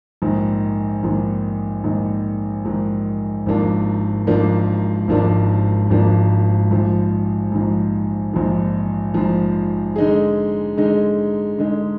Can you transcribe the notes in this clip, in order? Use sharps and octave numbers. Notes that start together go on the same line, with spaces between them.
A#1 G#2 D#3
A#1 G#2 D#3
A#1 G#2 D#3
A#1 G#2 D#3
G#1 G#2 F3 A#3 D4
G#1 G#2 F3 A#3 D4
G#1 G#2 F3 A#3 D4
G#1 G#2 F3 A#3 D4
A#1 G#2 F3
A#1 G#2 F3
A#1 G#2 F3
A#1 G#2 F3
D3 G#3 D#4 G#4
D3 G#3 D#4 G#4
D3 G#3 D#4 G#4